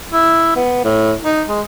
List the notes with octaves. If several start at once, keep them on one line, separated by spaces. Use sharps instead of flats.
E4
B3
A2
D#4
G#3